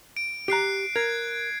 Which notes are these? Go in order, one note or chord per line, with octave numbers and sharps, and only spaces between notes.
D7
G4 A#5 F#6 C7 D7
A#4 G#6 C7